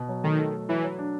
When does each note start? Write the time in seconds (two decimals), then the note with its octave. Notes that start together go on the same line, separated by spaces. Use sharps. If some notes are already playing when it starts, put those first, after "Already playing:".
Already playing: B2
0.09 F#3
0.23 D#3 A3
0.38 A4
0.54 A4
0.69 E3 F#3
0.83 F#3
0.98 D4